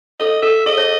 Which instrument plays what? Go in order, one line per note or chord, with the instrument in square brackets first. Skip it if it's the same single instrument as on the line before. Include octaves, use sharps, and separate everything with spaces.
[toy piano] A4 [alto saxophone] D#5
[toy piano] A4 [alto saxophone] E5
[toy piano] G#4 [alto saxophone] D#5
[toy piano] C#5